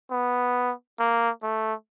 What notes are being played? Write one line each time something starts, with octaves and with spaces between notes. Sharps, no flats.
B3
A#3
A3